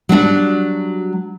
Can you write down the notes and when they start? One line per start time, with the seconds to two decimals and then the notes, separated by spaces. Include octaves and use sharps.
0.09 F#3 G3 D4 F#4